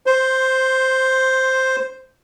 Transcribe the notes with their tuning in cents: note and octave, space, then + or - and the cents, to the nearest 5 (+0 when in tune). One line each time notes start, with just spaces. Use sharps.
C5 +0 C6 +15